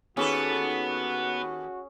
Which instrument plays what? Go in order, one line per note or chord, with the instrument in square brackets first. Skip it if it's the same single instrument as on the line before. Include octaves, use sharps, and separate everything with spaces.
[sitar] D#2 A4 B4 [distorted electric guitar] B3 [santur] C#4 G#4 [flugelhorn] F#4